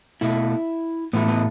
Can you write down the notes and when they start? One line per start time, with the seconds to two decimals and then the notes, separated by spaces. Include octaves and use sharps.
0.21 B2 A3 E4
1.13 A2 E3 A3 B3
1.28 B3